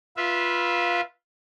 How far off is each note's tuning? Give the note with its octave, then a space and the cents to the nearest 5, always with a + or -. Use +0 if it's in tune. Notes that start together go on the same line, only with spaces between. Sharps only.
F4 +0 B4 -20 E5 +0